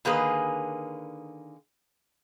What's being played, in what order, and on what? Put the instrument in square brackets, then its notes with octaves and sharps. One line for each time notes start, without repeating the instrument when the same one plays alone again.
[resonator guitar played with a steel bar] D3 D#3 A#3 G#4 B4